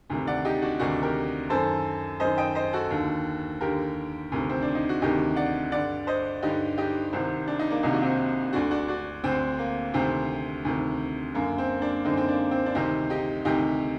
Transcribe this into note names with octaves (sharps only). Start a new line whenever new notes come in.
D2 C3 D#3
D5 F#5
D#4 G4
D4 F#4
D2 C3 D#3 D4 F#4
G4 A#4
F#2 D#3 A4 C5
F#2 D#3 C5 D#5
D#5 G5
C5 D#5
F#4 A4
D#2 D3
D#2 D3 G4 A#4
D2 C3 D#3
C4
D4
D#4
F#4
D2 C3 D#3 D#4 G4
D5 F#5
G2 D3 D5 F#5
C5 D#5
G2 D3 D#4 G4
D#4 G4
C2 C3 D#3 C4
D4
D#4
A#3 D4
C2 C3 D#3 D#4
F#4
C4 D#4
D2 D3 D4 F#4
D4 F#4
D4 F#4
D2 D3 C4
A#3
D2 C3 D#3 C4
D2 C3 D#3
F#2 D3 A#3
C4
A#3 D4
F#2 D3 C4 D#4
C4
A#3 D4
C4
D4
D2 C3 D#3 C4 D#4
D#4 G4
D2 C3 D#3 D#4 G4